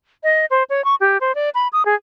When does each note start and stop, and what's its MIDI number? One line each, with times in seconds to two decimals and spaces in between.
0.24 0.45 75
0.50 0.63 72
0.70 0.84 73
0.85 0.95 85
1.00 1.18 67
1.21 1.35 72
1.35 1.50 74
1.55 1.68 83
1.73 1.85 87
1.86 1.95 68